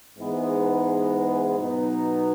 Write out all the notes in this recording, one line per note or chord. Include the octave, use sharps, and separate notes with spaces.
G#2 E3 G#3 B3 D#4
B2 F#3 B3 D#4